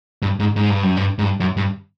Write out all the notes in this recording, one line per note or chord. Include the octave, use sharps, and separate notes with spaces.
G2
G#2
G#2
G2
F#2
G2
G#2
G2
F#2
G2